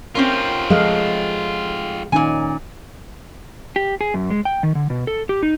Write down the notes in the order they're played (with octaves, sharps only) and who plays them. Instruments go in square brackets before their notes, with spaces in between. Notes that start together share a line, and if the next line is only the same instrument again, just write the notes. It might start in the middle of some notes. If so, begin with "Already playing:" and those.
[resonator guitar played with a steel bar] C4 C#4 A#4 [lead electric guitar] F4 G4
[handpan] F3 A4 F5 [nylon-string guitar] G#3
[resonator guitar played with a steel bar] A#2 G#5 [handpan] D#3 C#4 D#4
[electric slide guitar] G4
G#4
F#2
G#3
G5
D#3
D3
B2
A4
G4
D#4